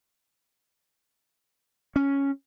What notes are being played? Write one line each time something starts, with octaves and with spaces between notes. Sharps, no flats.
C#4